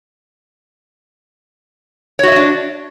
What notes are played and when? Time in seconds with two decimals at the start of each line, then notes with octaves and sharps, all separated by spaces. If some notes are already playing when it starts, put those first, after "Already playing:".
2.19 C#5
2.23 F#4
2.28 E5
2.32 D#5
2.36 D4